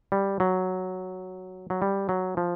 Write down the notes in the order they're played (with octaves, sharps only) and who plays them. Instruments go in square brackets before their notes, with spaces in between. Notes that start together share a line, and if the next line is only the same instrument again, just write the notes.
[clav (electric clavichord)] G3
F#3
F#3
G3
F#3
F3